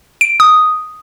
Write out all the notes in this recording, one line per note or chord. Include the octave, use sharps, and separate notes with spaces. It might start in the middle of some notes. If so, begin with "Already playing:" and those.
D7
D#6